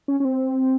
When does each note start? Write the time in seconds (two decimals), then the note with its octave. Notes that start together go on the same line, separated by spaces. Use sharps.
0.08 C#4
0.20 C#4
0.25 C4